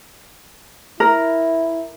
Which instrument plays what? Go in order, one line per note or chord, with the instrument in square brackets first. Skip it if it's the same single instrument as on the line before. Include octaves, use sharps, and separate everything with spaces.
[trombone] E4 [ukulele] A#4